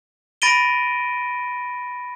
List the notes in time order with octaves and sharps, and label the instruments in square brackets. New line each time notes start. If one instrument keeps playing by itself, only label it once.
[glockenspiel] B5 A6 A#6 D7 D#7 G7